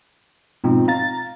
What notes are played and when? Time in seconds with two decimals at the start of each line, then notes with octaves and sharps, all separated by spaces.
0.64 G#2 B2 F3 C4 D#4
0.88 F5 A#5 A6